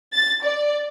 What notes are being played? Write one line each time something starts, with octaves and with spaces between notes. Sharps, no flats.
A6
D5